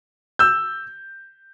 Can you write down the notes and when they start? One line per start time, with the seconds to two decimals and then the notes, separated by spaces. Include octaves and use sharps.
0.39 E6 G6